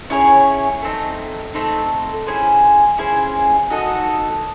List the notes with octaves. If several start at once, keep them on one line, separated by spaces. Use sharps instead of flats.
C#4 E4 G#4 C#5
A3 C4 D#4
A3 C4 D#4
C#4 E4 G#4 C5
C#4 E4 G#4 C5
D#4 F#4 A4 D#5